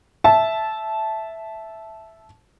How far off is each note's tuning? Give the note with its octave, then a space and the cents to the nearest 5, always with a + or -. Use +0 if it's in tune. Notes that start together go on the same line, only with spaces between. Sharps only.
E5 +0 A5 -15